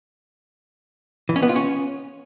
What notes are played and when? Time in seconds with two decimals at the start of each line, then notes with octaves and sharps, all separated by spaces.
1.29 E3
1.36 C#4
1.42 B3
1.49 F4
1.56 C#4